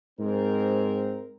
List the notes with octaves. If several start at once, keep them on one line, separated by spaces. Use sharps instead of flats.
G#2 C4 A#4